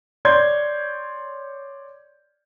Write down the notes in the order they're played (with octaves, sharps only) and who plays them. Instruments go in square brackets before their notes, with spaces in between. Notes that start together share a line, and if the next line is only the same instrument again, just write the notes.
[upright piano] C#5 D5 C6 G6 G#6